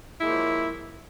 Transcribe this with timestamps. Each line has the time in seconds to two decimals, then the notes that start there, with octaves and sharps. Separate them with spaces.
0.19 E4
0.21 G#3
0.24 A#3
0.27 F#3
0.29 F3